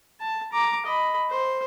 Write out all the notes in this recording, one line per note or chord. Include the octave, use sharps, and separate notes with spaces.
A5
A#5 D6
D#5 B5
C5